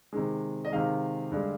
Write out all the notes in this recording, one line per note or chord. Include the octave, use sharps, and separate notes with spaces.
C3 D#3 G#3
D#5
C3 D#3 G#3 F5
G2 D3 G#3